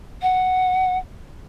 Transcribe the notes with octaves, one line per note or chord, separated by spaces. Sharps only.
F#5